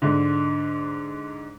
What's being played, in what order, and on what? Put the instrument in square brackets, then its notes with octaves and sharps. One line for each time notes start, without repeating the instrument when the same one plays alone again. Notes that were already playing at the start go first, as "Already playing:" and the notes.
[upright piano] G#2 D3